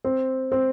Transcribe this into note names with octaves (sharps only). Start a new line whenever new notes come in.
C4
C4